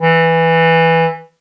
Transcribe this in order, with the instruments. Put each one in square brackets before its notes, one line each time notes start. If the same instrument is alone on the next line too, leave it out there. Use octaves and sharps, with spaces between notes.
[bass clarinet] E3